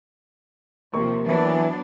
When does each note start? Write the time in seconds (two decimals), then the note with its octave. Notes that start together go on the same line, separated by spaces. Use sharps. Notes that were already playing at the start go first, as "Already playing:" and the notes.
0.94 D#2 C3 F3 A#3 C#6
1.26 E3 F#3 B3 D4